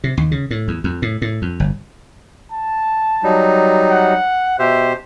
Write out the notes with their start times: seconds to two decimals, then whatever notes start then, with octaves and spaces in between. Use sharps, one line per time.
0.04 C3
0.17 D#2
0.31 C#3
0.51 A2
0.68 E2
0.84 F2
1.02 A2
1.22 A2
1.42 F2
1.60 G1
2.52 A5
3.23 F#3 G3 D#4
3.91 F#5
4.59 B2 G4 C5 E5